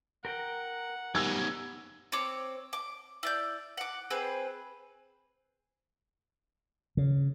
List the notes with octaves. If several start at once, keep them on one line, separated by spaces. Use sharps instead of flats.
A#4 F#5 G5
B2 D#3 G3 G#5 E6 G#6
C4 C#5 D6
D6
E4 D5 G6
F#5 D6
C4 G#4 B4 C5
C#3